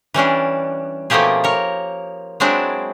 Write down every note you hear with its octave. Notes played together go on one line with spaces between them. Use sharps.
E3 G3 C#4 D4
B2 F3 A3 A#3 G4 G#4
A#4 C#5
F#3 G#3 C4 D4 E4